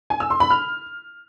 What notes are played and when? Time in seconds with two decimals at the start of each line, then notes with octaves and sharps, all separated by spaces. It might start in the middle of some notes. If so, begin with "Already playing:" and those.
0.10 G#5
0.20 E6
0.30 C6
0.40 B5
0.50 F6